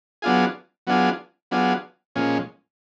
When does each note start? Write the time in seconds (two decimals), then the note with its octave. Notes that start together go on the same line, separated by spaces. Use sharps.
0.22 F#3 B3 D4 F4 G#4
0.87 F#3 B3 D4 F4 G#4
1.51 F#3 B3 D4 F4 G#4
2.16 A#2 F3 G#3 C#4